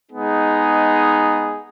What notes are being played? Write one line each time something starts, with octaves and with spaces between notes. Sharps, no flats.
G#3 B3 D#4 G#4